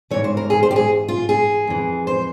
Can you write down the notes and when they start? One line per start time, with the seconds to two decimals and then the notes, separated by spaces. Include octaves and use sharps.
0.11 G#2 E3 C#5
0.24 C5
0.37 A#4
0.50 G#4
0.63 C5
0.71 G4
0.76 G#4
1.08 F4
1.29 G#4
1.67 F2 E3
2.07 C5